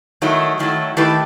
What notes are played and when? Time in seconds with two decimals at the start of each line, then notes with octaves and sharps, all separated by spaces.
0.22 D#3 F#3 A3 E4
0.59 D#3 F#3 A3 E4
0.97 D#3 A3 E4 G4 B4